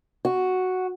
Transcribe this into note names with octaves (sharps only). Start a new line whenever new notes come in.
F#4